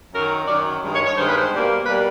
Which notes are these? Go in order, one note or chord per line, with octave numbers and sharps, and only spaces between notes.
F#2 D#3 F#3 A#4
F#2 D#3 F#3 D5
G2 D#3 G#3
C#5
C#5
G2 D#3 G#3 C5
B4
C5
B2 G3 A#3
B2 G3 A#3 B4